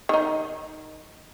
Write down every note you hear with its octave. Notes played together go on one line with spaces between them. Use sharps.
D#3 D#4